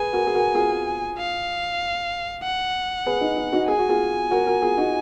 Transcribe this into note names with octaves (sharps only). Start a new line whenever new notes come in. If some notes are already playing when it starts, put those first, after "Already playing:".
Already playing: G#4 B4 G#5
F#4 A#4
G#4
F#4 A#4
F4 G#4
F5
F#5
G#4 B4
D#4
D#4
D#4 F#4
G#4 G#5
F#4
F4 G#4
F#4 A#4
F#4 A#4
F4 G#4
D#4 F#4